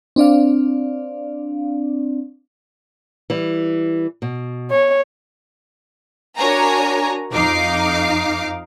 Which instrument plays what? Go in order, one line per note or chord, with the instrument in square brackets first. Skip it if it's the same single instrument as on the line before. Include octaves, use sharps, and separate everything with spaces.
[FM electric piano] C4 D4 D5 F5
[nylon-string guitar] E3 G3
B2
[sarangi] C#5
[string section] D4 F#4 A#4 C#5 G#5 A#5
F2 D#4 F5 D6 C7